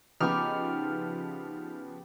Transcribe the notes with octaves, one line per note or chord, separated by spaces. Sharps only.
C#3 F3 B3 D#4 G4 G#5 B5 F6